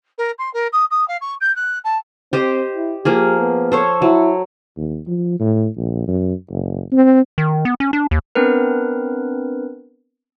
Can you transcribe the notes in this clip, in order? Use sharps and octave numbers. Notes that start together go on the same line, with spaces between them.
A#4
C6
A#4
D#6
D#6
F5
C#6
G6
F#6
A5
C4 G4 C5 D#5
E4
F3 A#3 G4 G#4
B3
A4 C5 C#5
F#3 E4
D#2
F3
A2
A#1
F#2
F#1
C4
D#3
B3
C#4
D4
D#2
B3 C4 D4 A#4 B4